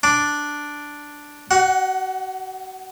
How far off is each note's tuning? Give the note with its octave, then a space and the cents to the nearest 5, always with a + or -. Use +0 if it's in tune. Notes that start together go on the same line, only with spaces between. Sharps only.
D4 +0 D6 +0
F#4 +35 F#5 +0